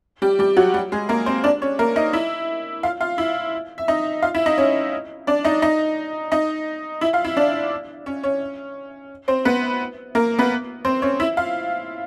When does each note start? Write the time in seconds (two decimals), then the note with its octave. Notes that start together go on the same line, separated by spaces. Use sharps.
0.22 G3 G4
0.39 G3 G4
0.57 F#3 F#4
0.74 G3 G4
0.92 G#3 G#4
1.09 A#3 A#4
1.26 C4 C5
1.44 D4 D5
1.62 C#4 C#5
1.79 A#3 A#4
1.96 D#4 D#5
2.13 E4 E5
2.83 F4 F5
3.01 F4 F5
3.18 E4 E5
3.78 E5
3.88 D#4 D#5
4.22 F4 F5
4.34 E4 E5
4.46 D#4 D#5
4.58 C#4 C#5
5.27 D4 D5
5.44 D#4 D#5
5.62 D#4 D#5
6.32 D#4 D#5
7.01 E4 E5
7.13 F4 F5
7.25 E4 E5
7.37 D4 D5
8.06 C#4 C#5
8.24 C#4 C#5
9.28 C4 C5
9.45 B3 B4
10.15 A#3 A#4
10.39 B3 B4
10.85 C4 C5
11.02 C#4 C#5
11.20 E4 E5
11.37 F4 F5